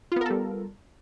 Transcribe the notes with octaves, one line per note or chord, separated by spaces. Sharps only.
G3 B3 F4 A4 A#4